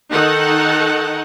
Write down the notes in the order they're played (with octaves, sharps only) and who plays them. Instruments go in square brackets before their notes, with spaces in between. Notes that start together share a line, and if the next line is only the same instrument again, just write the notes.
[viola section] D#3 D#4 A4 F#5